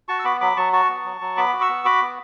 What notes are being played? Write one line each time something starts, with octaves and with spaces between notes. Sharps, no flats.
F#4 A5 C#6
E6
B3 B5 D6
F#3 B5 D6
F#3 A5 C#6
F#4 A5 C#6
B3
F#3
F#3
B3 B5 D6
F#4
C#6 E6
B3
F#4 B5 D6
B3